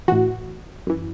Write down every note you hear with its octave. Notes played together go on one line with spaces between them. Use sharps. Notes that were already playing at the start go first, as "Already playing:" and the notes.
A2 E3 F#4
F#2 E3